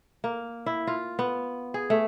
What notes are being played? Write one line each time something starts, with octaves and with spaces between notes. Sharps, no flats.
A#3
E4
F4
B3
G#4
A3